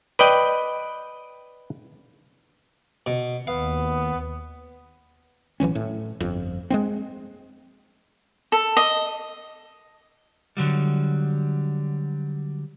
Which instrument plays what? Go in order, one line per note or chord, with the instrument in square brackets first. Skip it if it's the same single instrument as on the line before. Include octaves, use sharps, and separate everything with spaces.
[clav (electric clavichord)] B4 D5 D#5 G5
[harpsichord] B2
[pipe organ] D#2 [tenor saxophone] B3 [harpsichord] F5
[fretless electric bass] A1 E3 F#3 C#4
A2
G1 F2
G#3 B3 C4
[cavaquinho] A4
D#5
[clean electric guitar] D3 F#3 G3